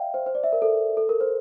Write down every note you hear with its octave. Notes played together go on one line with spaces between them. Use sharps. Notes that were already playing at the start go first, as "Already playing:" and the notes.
Already playing: D5 E5 F5 G5
C5
C5
D5
E5
A#4
A4
A4
A#4
C5